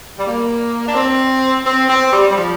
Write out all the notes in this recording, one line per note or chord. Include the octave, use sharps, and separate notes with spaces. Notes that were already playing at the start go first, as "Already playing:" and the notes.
G3
A#3
D4
C4
C4
C4
G3
G3
F3